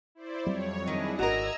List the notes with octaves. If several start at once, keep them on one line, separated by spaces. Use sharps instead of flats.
E4 C5 D5
F2 F#3 G3 C4 C#5
D#3 D4 E4 G#4 D#5
G#1 F#4 A#4 D#5 A#5 E6 G#6